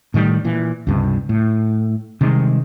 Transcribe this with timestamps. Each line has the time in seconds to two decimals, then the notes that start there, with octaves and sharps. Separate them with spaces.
0.14 A2 D#3 F#3 G3
0.44 A#2 E3
0.87 C#2 G2 C3
1.29 A2
2.21 C3 D#3 G3 G#3